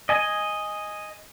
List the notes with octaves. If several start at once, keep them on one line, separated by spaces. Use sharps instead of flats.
D#5 G#5